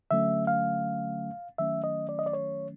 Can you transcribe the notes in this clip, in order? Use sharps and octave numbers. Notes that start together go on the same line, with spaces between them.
D3 F#3 A3 C#4 E5
F5
D#3 F#3 A3 C#4 E5
D#5
D5
D#5
D5
C#5